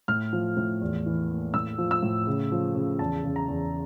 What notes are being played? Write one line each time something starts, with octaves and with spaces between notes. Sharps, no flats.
A2 F6
F3
A2
E2
E3
A#3
A2 E6
F3
E6
A2
C#3
F3
C#3
E2 A5
C#3
A#5
E2